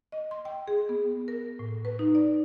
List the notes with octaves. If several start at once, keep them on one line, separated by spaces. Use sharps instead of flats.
D#5
C6
G5
G#4
B3
A#4
A2
B4
D#4
D5